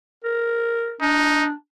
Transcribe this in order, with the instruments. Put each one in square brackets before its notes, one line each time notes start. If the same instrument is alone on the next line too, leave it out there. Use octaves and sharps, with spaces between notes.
[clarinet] A#4
[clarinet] D4 [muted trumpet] D#4